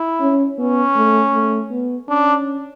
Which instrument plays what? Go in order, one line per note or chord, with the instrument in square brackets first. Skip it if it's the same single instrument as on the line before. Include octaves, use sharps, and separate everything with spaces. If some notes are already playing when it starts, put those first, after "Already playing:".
Already playing: [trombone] E4
[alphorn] C#4
[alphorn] B3 [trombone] C#4
[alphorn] A3
A3
B3
[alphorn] C#4 [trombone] D4